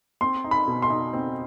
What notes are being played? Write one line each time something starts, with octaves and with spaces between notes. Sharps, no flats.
C4 C6
D#4
B5
B2
C6
D#4
C4